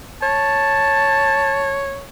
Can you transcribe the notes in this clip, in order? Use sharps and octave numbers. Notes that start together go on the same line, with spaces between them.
C#5 A5